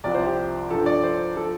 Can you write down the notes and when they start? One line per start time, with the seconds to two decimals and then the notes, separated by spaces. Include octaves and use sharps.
0.04 C2 C3 F3 D5
0.14 C5
0.26 G4
0.70 G2 F3 A4
0.86 D5
1.03 C5
1.36 F3 A4